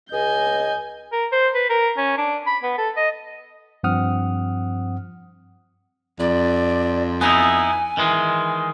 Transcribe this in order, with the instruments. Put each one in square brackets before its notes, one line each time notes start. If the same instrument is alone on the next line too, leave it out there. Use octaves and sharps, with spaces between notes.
[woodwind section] C#2 D#5 [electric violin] G#5 G6
[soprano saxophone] A#4
C5
B4
A#4
C#4
D4
B5
B3
A4
D#5
[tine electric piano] G2 F3 C4 F#5 D#6 F6
[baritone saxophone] F2 [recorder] D5
[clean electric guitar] B3 D#4 E4 [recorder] G#5
[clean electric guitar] D#3 E3 G#3